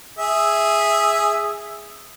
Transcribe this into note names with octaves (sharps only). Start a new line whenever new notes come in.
G#4 E5